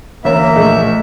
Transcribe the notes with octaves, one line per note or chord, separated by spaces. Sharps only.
D2 E3 A#3 C#4 C#5 E5
A#1 A3 G#4 D#5